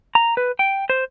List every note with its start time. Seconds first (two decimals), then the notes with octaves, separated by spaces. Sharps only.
0.15 A#5
0.37 B4
0.59 G5
0.90 C5